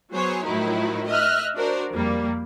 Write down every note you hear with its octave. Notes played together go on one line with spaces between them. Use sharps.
F#3 B3 G#4 C5 C#5
A2 D#3 F3 F#3 D#4 E4
D#5 E5 F6 F#6
D4 F#4 A#4 C5 D5
F2 G3 A#3